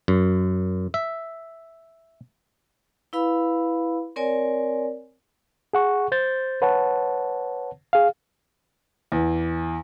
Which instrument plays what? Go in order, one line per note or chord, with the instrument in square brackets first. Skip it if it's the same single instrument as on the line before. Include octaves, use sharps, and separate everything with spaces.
[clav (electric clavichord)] F#2
E5
[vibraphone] E4 B4 F5 B5 E6
C4 A#4 C#5 D5 G#5
[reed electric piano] G#4 F#5 C#6
C5 G6 A6
B4 C#5 F#5 A5
G#4 F5
[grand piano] E2